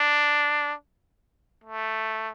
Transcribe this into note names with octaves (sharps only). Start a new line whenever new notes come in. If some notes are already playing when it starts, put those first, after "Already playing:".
Already playing: D4
A3